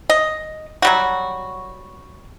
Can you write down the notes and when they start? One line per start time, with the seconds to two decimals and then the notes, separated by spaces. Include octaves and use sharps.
0.10 D#5
0.82 F#3 G3 F#4